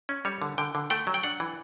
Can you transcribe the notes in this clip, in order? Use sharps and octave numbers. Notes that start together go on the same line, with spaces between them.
C#4
G3 C#5
D3
D3 G5
D3
A3 G5
F#3
G5
D4 F#5
E3